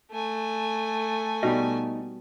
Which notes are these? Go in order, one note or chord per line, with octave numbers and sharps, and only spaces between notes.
A3 G#5
B2 G3 B3 D#4 D#5